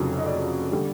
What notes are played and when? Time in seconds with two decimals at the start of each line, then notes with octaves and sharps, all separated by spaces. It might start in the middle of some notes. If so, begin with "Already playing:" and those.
Already playing: F1 F2 C#3 F#3 C#5
0.19 D#5
0.26 D5
0.71 D3 G3